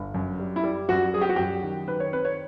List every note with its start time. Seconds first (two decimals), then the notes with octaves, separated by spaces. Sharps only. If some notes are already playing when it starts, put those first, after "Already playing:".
Already playing: G1
0.14 F#2
0.39 G3
0.56 E4
0.64 G3
0.89 F#2 F#4
1.13 G3 G#4
1.21 G4
1.29 F#4
1.36 F#2 G4
1.63 D#3
1.88 D#3 B4
2.00 C#5
2.12 C4 B4
2.25 C#5